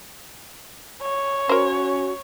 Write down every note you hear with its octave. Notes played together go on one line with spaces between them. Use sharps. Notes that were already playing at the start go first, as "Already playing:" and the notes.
C#5
C#4 F#4 A#4 C5